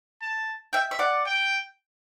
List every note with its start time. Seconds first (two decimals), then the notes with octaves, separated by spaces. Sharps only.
0.22 A5
0.73 E5 G5
0.91 E5
0.99 D5 F#5
1.26 G5